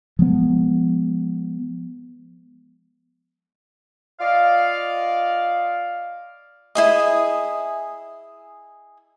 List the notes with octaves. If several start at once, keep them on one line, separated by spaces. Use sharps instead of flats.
F3 G#3 B3
F4 D5 D#5 F5
E4 G#4 D#5